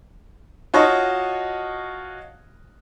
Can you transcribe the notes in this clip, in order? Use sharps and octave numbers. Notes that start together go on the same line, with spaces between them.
F4 F#4 C#5 D#5 A5 C#6